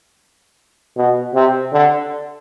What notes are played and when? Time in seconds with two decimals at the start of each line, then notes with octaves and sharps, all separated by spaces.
0.97 B2
1.35 C3
1.73 D3